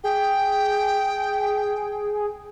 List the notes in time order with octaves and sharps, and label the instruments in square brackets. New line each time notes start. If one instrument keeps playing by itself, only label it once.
[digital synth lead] G#4 [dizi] G5